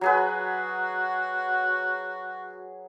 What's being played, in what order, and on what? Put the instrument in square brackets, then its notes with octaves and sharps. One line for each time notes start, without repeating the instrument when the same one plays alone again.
[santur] F#3 G#4 B4 [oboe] F#4